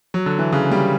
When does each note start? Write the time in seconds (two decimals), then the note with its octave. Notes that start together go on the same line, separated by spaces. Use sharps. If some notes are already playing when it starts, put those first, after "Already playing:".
0.14 F#3
0.26 D3
0.39 E3
0.52 C#3
0.71 G3